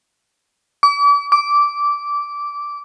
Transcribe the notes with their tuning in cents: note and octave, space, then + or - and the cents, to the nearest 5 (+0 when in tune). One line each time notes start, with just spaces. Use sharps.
D6 -40
D6 -15